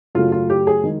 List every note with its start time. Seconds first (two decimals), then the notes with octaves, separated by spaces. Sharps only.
0.15 F#2 C#3 F#3 A3 F4
0.32 F4
0.50 G4
0.67 G#4
0.83 D#3 G#3